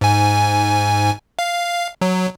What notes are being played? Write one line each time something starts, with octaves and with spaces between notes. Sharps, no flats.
G#2 G#5
F5
F#3